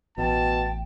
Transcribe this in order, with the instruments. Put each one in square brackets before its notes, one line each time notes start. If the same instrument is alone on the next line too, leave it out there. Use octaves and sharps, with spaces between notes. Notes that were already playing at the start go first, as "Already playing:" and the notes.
[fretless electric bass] A1 [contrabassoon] B2 [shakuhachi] G5 [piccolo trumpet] A5